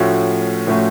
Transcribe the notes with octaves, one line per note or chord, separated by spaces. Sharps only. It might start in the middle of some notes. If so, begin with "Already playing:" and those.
Already playing: A2 F3 A3 C#4 F#4
A2 F3 A3 C#4 F#4